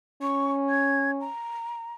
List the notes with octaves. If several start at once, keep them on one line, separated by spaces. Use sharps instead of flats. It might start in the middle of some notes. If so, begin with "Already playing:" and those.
C#4 C#6
G#6
A#5